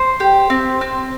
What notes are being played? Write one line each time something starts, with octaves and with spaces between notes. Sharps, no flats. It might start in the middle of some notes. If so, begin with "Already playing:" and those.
Already playing: C5
G4
C4
C4